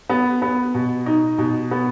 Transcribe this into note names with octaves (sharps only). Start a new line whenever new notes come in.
B3
B3
B2
D#4
B2
B3